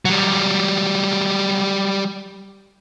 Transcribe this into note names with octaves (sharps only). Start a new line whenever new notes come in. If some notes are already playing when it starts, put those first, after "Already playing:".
F#3 G3